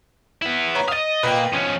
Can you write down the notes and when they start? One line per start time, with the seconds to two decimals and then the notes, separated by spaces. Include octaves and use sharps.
0.42 B3 E4
0.75 B4 C#5 A#5
0.88 D#5 F5 D#6 A6
1.23 A#2 A#3 B4 D#5 G5
1.53 F3 C#4